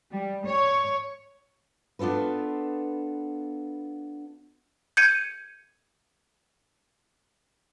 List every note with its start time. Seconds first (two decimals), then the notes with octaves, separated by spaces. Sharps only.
0.11 G3
0.45 C#5
1.99 B3 D4 F4 A4 B4
4.97 G6 G#6 C#7 D#7